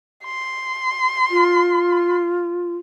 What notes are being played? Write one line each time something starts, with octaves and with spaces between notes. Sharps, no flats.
C6
F4